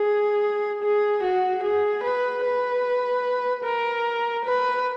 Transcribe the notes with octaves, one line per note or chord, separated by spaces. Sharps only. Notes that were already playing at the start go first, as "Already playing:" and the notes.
Already playing: G#4
G#4
F#4
G#4
B4
B4
A#4
B4